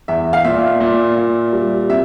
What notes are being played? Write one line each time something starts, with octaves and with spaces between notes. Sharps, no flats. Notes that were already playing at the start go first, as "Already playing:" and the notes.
E2 E5
F5
A#2 E5
A#2
A#2
G3
C3 E5